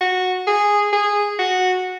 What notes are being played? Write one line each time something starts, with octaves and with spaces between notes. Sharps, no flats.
F#4
G#4
G#4
F#4